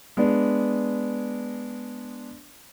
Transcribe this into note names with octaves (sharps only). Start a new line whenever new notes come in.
G#3 B3 D4